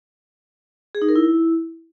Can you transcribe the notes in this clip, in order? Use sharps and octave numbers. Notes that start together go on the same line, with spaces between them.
G#4
D#4
A#4
E4